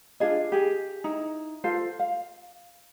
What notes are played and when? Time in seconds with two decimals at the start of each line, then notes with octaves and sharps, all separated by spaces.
0.20 D4 F4 G#4 D#5
0.52 G4 G#4
1.04 D#4 E4
1.64 F4 A4 C5 F5
1.99 F5